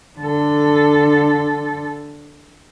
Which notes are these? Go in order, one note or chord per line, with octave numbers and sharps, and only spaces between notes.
D3 A4